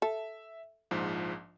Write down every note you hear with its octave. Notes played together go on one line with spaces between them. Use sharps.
A4 E5
A#1 G#2 F3